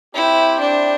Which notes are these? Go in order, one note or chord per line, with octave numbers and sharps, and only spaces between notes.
C4 E4 G4 C5 G5
D4